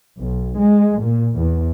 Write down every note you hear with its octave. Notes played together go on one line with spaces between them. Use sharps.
B1
G#3
A#2
E2